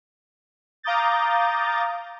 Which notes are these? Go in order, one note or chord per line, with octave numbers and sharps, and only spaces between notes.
F5 A#5 D6 D#6 G6 A6